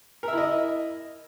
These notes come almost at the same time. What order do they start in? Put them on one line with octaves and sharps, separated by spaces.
A#4 E5 E4 D#5